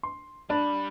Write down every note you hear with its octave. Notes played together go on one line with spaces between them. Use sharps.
C6
G3 D4 B5